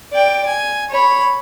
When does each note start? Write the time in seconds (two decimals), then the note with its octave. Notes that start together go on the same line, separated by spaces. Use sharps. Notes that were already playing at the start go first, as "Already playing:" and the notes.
0.13 D5 G5
0.46 G#5
0.90 C#5 B5